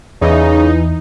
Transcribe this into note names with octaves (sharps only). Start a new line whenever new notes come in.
E2 C#3 E3 D#4